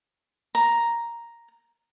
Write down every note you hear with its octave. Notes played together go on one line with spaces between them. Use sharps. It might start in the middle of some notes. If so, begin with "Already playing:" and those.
A#5